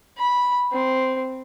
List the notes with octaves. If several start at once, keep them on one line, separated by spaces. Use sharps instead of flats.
B5
C4